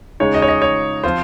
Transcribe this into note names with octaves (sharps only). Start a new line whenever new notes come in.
C#3 G#3 D#4 C#5
D#5
C#5
D#5
C#5
F3 C4 F4 C5